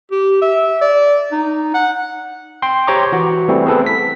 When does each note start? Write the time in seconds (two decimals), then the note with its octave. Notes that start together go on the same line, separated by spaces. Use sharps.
0.12 G4
0.42 E5
0.81 D5
1.32 D#4
1.74 F#5
2.62 G5 C6
2.87 G4 C5 C#5 A#5 C#6 D6
3.12 E3 F#4
3.48 E3 G3 A3 C4
3.66 B3 C4 G#4 A4 B4
3.86 B6